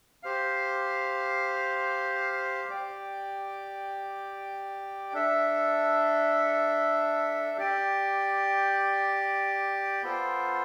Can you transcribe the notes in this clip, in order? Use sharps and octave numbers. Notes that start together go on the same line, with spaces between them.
G4 C5 F5
G4 D5 G5
D4 A4 E5
G4 D5 G5
B3 F4 A4 C5